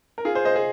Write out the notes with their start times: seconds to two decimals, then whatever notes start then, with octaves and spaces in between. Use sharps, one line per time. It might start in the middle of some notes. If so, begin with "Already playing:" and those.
0.18 A#4
0.25 F4 G#4
0.35 G#4 C5
0.45 C5 D#5
0.55 G#4 C5